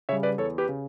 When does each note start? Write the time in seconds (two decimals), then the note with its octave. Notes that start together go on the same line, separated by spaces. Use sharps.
0.09 C#3 G3 C#5 E5
0.23 B4 D5
0.38 E2 A4 C#5
0.58 G4 B4
0.69 C#3